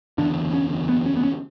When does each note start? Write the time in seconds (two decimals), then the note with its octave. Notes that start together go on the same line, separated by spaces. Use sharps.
0.18 F#1 E2 D3 D4
0.53 C#4
0.89 B3
1.06 C#4
1.17 B3
1.23 C#4